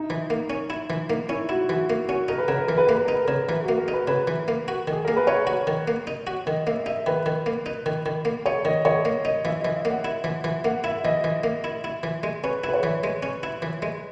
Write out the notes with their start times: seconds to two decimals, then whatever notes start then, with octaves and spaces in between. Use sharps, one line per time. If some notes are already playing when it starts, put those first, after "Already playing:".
Already playing: D#4 E4
0.10 E3
0.30 A#3
0.50 C#4
0.70 E4
0.90 E3
1.10 A#3 D#4
1.29 C#4 E4
1.49 E4 F#4
1.69 E3 F#4
1.90 A#3
2.09 C#4 F#4
2.28 D#4 A#4
2.38 B4
2.48 C#3 A#4
2.57 B4
2.68 E3 A#4
2.78 B4
2.87 A#3 A#4
2.96 B4
3.05 D#4 A#4
3.15 B4
3.25 A#4
3.28 C#3
3.48 E3 B4
3.64 F#4
3.69 A#3
3.78 A#4
3.88 D#4
3.93 B4
4.08 C#3 B4
4.27 E3
4.48 A#3
4.68 F#4
4.88 D#3
4.93 G#4
5.05 A#3 A#4
5.17 B4
5.27 D#4 C#5
5.47 F#4
5.67 D#3
5.88 A#3
6.07 D#4
6.27 F#4
6.46 D#3 D#5
6.67 A#3 E5
6.86 D#4 E5
7.06 D#3 B4
7.26 D#3
7.46 A#3
7.66 D#4
7.86 D#3
8.06 D#3
8.25 A#3
8.46 D#4 C#5
8.65 D#3 D#5
8.85 D#3 C#5
9.05 A#3
9.25 D#4 D#5
9.45 E3 E5
9.61 D#5
9.65 E3
9.74 E5
9.85 A#3
9.90 F#5
10.05 E4
10.24 E3
10.44 E3
10.65 A#3 F#5
10.84 E4 E5
11.04 E3 D#5
11.24 E3
11.44 A#3
11.64 E4
11.84 E4
12.03 E3
12.23 G#3
12.44 C#4 B4
12.64 E4 B4
12.73 C#5
12.83 E3
13.04 G#3
13.23 C#4
13.43 E4
13.62 E3
13.82 G#3